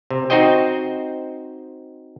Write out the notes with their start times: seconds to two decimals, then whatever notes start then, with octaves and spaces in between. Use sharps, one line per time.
0.10 C3
0.30 C4 D#4 F#4 C5 D#5 G5